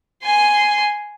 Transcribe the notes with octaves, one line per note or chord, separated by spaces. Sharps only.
G#5 C6